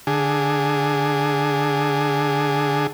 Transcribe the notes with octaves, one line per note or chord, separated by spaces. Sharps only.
D3 G#4